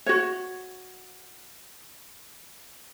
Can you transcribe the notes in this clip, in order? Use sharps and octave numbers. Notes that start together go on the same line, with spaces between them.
F#4 C#5